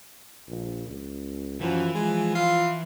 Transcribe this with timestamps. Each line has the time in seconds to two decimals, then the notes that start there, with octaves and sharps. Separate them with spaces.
0.48 A#1
0.87 C#2
1.61 F#2 E3 F3
1.94 F3 G#3
2.35 F4